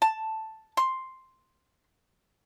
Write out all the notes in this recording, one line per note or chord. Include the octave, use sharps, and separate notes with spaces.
A5
C6